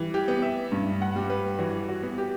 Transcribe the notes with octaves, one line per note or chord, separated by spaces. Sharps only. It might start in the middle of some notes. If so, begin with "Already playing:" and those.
Already playing: E3 G3
G4
B3
E5
G2
F#5
G3
B4
E3 F#4
F#4
B3
G4